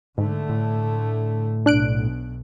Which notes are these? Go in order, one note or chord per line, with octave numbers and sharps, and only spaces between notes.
G#2 D3 A3
A2
B1 B2 D4 F#6 D7